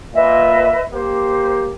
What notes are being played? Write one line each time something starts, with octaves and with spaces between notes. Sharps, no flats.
A#2 B4 D#5 E5
A#3 G4 C5